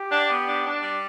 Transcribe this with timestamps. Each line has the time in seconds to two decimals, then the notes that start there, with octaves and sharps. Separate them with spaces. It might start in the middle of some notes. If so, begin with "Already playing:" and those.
Already playing: G4
0.11 D4
0.30 B3
0.47 D4
0.65 D4
0.82 G3